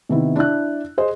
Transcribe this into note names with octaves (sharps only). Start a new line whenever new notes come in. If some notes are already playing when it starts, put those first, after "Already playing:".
C3 D#3 B3 E4
D4 E4 F#6
G#4 C5 D#5